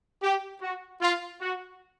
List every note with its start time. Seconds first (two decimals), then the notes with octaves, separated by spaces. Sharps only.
0.22 G4
0.62 F#4
1.02 F4
1.41 F#4